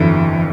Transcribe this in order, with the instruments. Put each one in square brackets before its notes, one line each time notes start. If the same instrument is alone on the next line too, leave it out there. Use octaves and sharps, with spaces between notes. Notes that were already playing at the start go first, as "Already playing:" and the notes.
Already playing: [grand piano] G1 F2 D3 F#3 [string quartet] E3